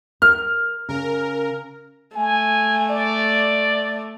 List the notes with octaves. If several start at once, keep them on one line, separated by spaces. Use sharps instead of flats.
A#4 F6
C#3 A#4
A3 G#5
D5